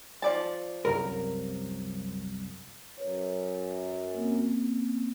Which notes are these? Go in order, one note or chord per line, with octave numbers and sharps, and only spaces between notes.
F3 D5 A5
C2 F#2 A#4
F#2 B4 C#5
A#3 C4 C#4